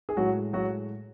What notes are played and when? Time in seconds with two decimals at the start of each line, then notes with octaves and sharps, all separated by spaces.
0.09 G#4
0.17 A2 F#3 G#3 F#4
0.53 F#3 F#4